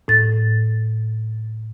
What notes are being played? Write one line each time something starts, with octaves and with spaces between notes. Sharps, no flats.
A2 A6